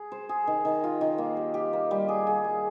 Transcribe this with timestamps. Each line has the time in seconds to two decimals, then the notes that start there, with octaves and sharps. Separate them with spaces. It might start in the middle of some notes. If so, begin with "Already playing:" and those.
Already playing: G#4
0.12 C5
0.29 G#4
0.47 D#3
0.65 D#3
0.84 F4
1.01 D#3
1.18 A#3
1.37 G4
1.54 G4
1.73 A#3
1.91 G3
2.09 G#4
2.27 G#4
2.44 G#4